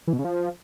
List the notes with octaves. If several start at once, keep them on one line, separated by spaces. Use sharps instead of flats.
E3
B2
C#3
F3